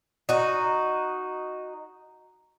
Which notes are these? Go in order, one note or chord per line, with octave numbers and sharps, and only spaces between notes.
D#4 F#4